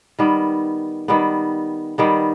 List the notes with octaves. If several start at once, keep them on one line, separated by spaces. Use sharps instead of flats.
D#3 G3 B3
D#3 G3 B3
D#3 G3 B3